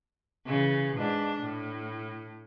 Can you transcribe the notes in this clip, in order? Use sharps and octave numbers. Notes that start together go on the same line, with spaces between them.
C#3 E3
G#2 D4
A2